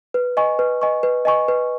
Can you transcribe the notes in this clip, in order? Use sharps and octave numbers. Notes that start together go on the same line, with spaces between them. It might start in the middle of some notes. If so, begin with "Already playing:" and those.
B4
D#5 G#5 C#6
B4
D#5 G#5 C#6
B4
D#5 G#5 C#6
B4